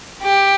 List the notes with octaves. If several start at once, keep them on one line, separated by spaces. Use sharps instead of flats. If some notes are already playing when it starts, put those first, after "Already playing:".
G4